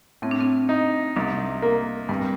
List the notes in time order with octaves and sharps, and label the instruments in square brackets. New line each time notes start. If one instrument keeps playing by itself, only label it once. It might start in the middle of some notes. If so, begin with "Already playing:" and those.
[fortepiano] A2 [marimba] C4
[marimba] D4
C4
[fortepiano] D#4
[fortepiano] C2 [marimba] D4
[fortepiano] A#3
[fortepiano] G2 [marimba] C4